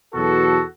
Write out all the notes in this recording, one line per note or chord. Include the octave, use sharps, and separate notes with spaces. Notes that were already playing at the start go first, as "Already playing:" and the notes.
E2 B2 F#3 F#4 A4